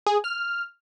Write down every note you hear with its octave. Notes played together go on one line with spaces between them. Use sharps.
G#4
F6